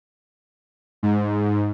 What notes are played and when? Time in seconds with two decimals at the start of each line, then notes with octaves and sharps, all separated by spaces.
1.03 G#2